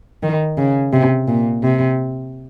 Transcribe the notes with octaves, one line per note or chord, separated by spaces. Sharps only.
D#3
C#3
C3
A#2
C3